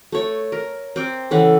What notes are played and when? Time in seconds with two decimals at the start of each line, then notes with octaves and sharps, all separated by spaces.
0.12 A3 C#5
0.52 A#4
0.96 C4 D6
1.31 C#3 E3 A4 F#5